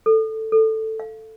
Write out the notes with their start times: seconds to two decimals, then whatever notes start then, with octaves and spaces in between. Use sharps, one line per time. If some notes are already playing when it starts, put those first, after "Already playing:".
0.06 A4
0.52 A4
1.00 F5